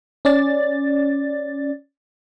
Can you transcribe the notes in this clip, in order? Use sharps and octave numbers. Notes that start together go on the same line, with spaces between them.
C#4 D5 A6